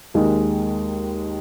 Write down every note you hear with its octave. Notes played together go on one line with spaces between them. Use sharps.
D#2 D#3 G#3